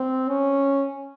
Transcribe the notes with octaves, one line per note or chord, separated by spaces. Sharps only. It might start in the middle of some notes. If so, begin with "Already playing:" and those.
Already playing: C4
C#4